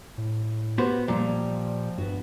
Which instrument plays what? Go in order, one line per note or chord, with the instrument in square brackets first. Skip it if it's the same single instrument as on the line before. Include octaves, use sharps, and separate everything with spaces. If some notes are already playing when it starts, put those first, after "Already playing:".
[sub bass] A2
[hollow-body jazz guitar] B3 F#4 C5 [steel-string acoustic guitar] G4
[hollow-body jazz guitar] A#2 [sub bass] F3 [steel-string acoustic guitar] G3 A#5
[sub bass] G2 [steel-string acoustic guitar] B3 F#4